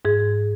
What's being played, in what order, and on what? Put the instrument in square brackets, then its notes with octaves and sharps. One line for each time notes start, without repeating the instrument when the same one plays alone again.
[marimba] G#2 G#4